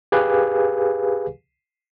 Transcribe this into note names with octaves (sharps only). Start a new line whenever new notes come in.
G4 G#4 B4 F5 G#5